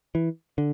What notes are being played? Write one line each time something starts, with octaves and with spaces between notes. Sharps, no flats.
E3
D3